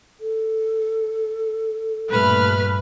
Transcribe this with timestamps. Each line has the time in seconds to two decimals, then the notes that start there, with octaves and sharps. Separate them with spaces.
0.20 A4
2.10 G2 A#2 A3 B4 B5 F6